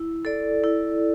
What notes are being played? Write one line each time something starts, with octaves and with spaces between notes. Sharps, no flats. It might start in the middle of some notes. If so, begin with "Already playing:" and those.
Already playing: E4
A4 D5
E4